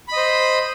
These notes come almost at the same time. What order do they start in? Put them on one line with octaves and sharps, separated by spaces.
B5 D#5 C5